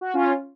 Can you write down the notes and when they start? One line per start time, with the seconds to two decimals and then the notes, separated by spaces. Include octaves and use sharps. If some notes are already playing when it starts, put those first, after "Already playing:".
0.01 F#4
0.14 C#4 F4